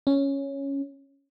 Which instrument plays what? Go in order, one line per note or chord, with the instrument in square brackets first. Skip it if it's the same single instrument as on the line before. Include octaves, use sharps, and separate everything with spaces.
[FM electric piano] C#4